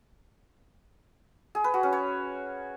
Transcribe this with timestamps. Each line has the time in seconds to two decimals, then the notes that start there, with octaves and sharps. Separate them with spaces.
1.55 G#4
1.64 B4
1.74 F#4
1.83 C#4
1.93 C#5